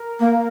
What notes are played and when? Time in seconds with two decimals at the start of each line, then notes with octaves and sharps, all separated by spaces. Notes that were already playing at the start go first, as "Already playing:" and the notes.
Already playing: A#4
0.20 A#3